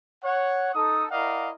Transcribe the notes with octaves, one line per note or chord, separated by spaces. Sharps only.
C#5 F#5
D#4 A4 D#6
E4 A#4 D5 D#5 F5 F#5